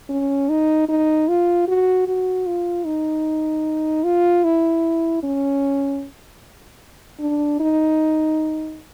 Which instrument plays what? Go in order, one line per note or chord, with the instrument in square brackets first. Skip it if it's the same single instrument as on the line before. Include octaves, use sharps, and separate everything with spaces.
[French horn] C#4
D#4
D#4
F4
F#4
F#4
F4
D#4
F4
E4
C#4
D4
D#4